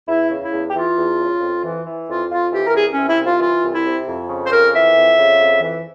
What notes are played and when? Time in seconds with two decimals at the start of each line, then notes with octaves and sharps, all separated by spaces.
0.08 E2 E4
0.30 C#3
0.41 E4
0.52 E2
0.70 G4
0.74 E3 F4
0.97 E2
1.19 C#3
1.41 F2
1.63 E3
1.85 E3
2.08 F2 F4
2.30 F2 F4
2.52 E3 G4
2.66 A#4
2.74 C2 G#4
2.91 C#4
2.96 C3
3.07 E4
3.18 C2
3.24 F4
3.40 E3 F4
3.63 C2
3.73 E4
3.85 C3
4.07 F2
4.29 C#3
4.44 C5
4.51 F2 A#4
4.73 E3 E5
4.96 F2
5.17 C#3
5.40 F2
5.62 E3